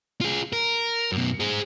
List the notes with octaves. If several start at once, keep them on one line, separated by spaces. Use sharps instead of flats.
F4 G#4
A#4
F#2 B2
G#4 C5